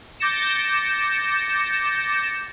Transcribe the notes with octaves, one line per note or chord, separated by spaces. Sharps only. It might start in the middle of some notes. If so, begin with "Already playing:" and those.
D6 G6 A6 A#6 C#7 E7